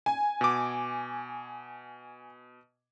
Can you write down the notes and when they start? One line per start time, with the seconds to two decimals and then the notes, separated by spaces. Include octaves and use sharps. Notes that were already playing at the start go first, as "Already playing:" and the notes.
0.06 G#5
0.41 B2 D6